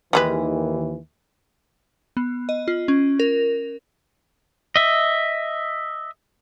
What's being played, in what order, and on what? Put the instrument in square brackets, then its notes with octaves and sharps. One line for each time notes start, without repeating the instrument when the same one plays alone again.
[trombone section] D#2 D#3 E3 [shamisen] G3 G#3 B4
[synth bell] B3
D#5
F4
C#4
A#4
[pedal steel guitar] D#5 E5